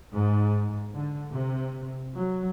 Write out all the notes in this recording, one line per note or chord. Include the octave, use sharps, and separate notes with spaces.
G#2
D3
C3
F#3